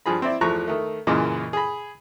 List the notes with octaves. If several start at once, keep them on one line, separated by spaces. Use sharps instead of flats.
G2 F3 G#4 B5
C4 E4 D5
E2 F3 A3 A#5 C#6 F#6
D#3 A3
F#2 A#2 C#3 E3 D#5 D6
G#4 B5